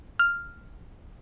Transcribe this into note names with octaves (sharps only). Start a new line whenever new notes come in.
F6